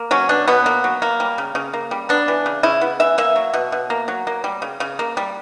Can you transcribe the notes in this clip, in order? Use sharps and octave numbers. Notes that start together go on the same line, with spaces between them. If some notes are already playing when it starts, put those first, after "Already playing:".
Already playing: A#3
F#3 C#4
B2 D4
B2 B3
A#3
F#3
A#3
G3
C#3
C#3
A#3
G3
B3 D4
E3
C#3
C#3 E4
B3
E3 E5
A#3 E5
F#3
B2
B2
A#3
F#3
A#3
G3
C#3
C#3
A#3
G3